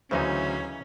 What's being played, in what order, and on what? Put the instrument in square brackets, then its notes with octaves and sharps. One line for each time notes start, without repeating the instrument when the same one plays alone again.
[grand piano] D2 F#3 C5 [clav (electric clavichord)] C#3 E3 D#4 [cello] C#4